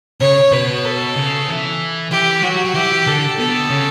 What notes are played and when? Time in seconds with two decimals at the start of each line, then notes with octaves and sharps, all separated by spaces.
0.21 C#3 C#5
0.52 B2 B4
0.84 A4
1.16 C#3
1.48 E3
2.11 E3 G4
2.43 F#3 F#4
2.64 F#3
2.75 E3 G4
3.07 D3 A4
3.39 B2 A4
3.70 C#3